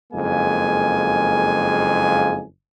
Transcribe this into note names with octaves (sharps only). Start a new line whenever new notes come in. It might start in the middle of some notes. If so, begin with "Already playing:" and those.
F#1 F2 G#3 A#3 G#5